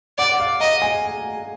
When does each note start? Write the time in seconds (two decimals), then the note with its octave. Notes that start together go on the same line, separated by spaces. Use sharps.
0.18 D5 F#5
0.40 F5
0.60 D#5 A#5
0.82 G#5